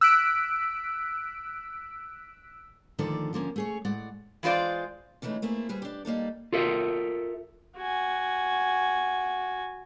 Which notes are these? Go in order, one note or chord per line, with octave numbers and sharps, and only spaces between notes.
E6 F#6 B6 D7
D2 D3 D#3 F3 A4 D5
D3 F3 A#3 C#4
A3 G#4 C#5
A2 G#3 D5 F#5
E3 G#3 F4 C5 D5
C#3 E3 G#3 A3 D#4
A3 A#3 C4 E4 G#4
D3 G3 G#4 B4 C5
D4 G4
G3 A#3 D#4 A4
F4 A4 A#4 E5
F#4 G#5